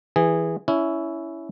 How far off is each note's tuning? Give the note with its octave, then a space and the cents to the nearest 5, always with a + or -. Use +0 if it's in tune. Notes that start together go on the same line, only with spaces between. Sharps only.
E3 +0 G#4 -15
C#4 +20 E4 +0